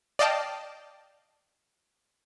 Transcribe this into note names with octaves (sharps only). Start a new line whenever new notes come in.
D5 D#5 F5 G5 A5